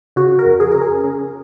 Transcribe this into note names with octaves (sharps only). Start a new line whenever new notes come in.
C#3 F#4
A#4
F2
G#4
C#3 A#4
G#4
C#3